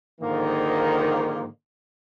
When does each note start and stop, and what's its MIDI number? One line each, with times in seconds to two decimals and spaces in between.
0.21 1.46 44
0.21 1.46 50
0.21 1.46 51
0.21 1.46 53
0.21 1.46 58